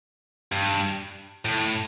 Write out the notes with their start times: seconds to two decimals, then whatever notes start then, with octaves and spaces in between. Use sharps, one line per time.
0.52 G2
1.45 A2